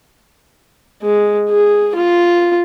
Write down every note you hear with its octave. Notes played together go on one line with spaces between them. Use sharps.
G#3
G#4
F4